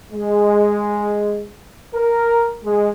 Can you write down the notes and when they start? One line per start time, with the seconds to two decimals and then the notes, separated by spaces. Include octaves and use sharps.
0.13 G#3
1.95 A#4
2.64 G#3